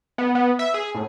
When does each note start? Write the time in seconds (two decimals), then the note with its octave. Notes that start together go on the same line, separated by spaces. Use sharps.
0.18 B3
0.35 B3
0.59 E5
0.74 G#4
0.95 A2